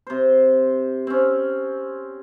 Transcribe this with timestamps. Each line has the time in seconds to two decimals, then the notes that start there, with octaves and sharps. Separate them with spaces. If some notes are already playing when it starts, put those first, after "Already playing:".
0.07 C3 C5
1.07 C4 C#4